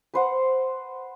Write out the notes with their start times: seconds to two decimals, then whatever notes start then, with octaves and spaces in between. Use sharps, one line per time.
0.14 B4 C5 F#5